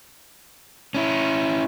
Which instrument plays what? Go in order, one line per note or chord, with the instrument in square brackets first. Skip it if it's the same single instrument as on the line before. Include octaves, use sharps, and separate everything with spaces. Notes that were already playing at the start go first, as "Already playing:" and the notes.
[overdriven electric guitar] C#4 E4